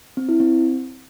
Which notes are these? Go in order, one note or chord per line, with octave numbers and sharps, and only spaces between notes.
C4
E4
C4